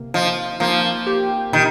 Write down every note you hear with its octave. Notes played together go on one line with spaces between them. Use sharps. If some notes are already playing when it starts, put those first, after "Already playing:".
Already playing: C3 A#3
F3 D#4
F3 A#3
G4
A#2 D#3